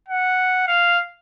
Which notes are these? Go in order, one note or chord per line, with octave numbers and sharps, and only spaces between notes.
F#5
F5